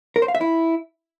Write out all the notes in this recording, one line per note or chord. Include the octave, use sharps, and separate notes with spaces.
A#4
C5
F5
E5
E4